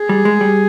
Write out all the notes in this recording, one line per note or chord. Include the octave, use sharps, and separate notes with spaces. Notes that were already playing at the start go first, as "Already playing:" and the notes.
Already playing: G#4
G3
G#3
G3